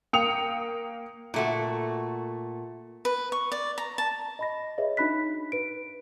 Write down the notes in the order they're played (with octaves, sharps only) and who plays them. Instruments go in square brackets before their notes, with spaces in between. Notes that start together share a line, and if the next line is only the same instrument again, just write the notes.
[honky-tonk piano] A#3 G5 D#6 C#7 F7
[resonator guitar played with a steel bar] A#2 A3 F#4
[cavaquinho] B4
C#6
D5
A#5
A5
[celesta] D#5 B5 A#6
G#4 B4 C#5 D#5 E5
D4 D#4 F#4 B5 F#6 B6
B4 D7